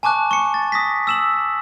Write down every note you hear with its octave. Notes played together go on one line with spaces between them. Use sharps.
G#5 A5 C#6 D6 F#6
C#6 C#7
A6
D#6 A#6 B6
E6 E7 F#7